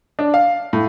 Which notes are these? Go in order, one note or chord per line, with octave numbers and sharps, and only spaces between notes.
D4
F5
A2